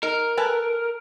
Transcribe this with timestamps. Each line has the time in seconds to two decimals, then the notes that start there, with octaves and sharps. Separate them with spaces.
0.03 D#4 A#4
0.37 A4 B4 G#5